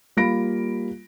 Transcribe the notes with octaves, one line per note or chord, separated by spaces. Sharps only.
G3 A#3 F4 B5 A#6 D7